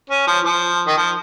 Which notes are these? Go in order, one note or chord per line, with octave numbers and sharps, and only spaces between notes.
C#4
F3
F3
D#3
F3